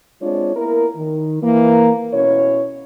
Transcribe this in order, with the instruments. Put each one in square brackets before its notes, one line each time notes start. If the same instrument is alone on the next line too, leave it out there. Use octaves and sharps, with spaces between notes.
[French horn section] G#3 C4 D4 F4 C#5
A#3 B3 E4 A#4
D#3
E3 A#3
B2 C#4 E4 C#5